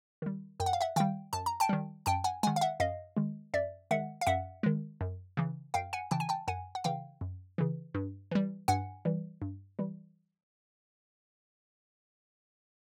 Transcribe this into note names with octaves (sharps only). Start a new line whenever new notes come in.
D#3 G3
F#2 G5
F#5
F5
E5 F#5
D#3 G3 F5 G5
F#2 A5
A#5
G5 A5
D#3 G3
F#2 G5 A5
F#5 G#5
D#3 G#3 F#5 G#5
F5
E5 F#5
F#2 D#5 F5
D#3 G#3
F#2 D5 E5
D#3 G#3 E5 F#5
F5
F#2 E5 F#5
D#3 G#3
F#2
C#3 E3
F#2 F5 G5
F#5 G#5
C#3 E3 G5 A5
G#5
G5 A5
F#2 F#5 G#5
F#5
C#3 E3 F5 G5
F#2
C#3 E3
G2
E3 G3
G2 F#5 G#5
E3 G3
G2
E3 G3